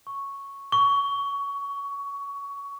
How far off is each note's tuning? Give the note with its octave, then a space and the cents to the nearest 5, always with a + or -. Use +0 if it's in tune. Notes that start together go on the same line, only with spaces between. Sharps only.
C#6 +0
C#6 +20